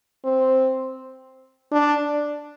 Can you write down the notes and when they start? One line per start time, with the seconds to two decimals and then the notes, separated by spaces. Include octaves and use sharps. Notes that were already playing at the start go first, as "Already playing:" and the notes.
0.25 C4
1.72 D4